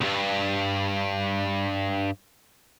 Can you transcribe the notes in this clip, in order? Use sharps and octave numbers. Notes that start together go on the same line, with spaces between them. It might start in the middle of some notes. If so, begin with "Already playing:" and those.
C2 G2